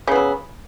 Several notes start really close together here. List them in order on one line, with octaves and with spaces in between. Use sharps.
C#3 B3 F#3